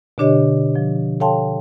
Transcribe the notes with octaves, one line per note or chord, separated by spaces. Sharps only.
B2 D3 D4 G4 C#5 D#5
F3
A4 C#5 F5 G5 A5 C6